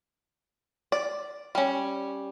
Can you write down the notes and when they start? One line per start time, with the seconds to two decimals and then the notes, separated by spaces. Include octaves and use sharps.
0.92 D5
1.55 G3 C#4